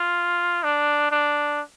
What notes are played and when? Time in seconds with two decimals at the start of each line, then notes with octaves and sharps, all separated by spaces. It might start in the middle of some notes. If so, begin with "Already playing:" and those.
Already playing: F4
0.63 D4
1.11 D4